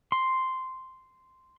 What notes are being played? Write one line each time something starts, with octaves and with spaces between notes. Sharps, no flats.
C6